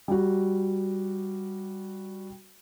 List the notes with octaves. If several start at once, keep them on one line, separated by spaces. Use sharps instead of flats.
G3 F#4